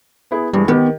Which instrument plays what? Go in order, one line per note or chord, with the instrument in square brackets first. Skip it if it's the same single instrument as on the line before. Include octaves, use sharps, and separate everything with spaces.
[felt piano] B3 E4 G#4
[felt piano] G2 E3 G#3 [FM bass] G3
[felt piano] D#3 G4 [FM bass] B3